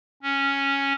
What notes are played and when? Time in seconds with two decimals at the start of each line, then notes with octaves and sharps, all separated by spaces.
0.22 C#4